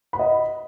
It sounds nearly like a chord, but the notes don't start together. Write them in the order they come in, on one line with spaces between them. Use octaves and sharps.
B5 F#5 D#5